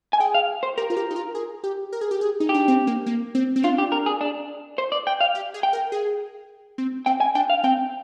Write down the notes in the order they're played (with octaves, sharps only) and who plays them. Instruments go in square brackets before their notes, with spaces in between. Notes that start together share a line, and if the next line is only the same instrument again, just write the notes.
[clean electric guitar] G#5
[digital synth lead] G#4 [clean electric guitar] G5
[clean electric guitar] F5
C5
[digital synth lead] G4 [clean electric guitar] A#4
[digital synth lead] F4
G4
D#4
F4
G#4
G4
A#4
G#4
G4
G#4
D#4
[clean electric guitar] G4
[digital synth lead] D4
C4
A#3
A#3
C4
C4
[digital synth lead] D4 [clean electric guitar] F4
[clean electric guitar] G4
A#4
G#4
D4
C5
D5
G5
F5
[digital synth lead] G4
G#4
[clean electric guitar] G5
[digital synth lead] A#4
G#4
C4
[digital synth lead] C4 [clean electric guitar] G5
[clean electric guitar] G#5
[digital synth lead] D4 [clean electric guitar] G5
[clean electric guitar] F5
[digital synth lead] C4 [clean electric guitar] G5